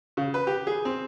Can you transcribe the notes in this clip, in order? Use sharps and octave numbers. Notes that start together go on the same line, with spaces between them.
C#3
B4
G4
G#4
C4